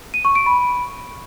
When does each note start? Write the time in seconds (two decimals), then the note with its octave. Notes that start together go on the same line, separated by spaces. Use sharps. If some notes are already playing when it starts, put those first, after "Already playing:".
0.14 D#7
0.25 C#6
0.35 D7
0.46 B5